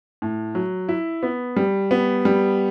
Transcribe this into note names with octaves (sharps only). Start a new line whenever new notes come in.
A2
F#3
E4
B3
G3
B3
G3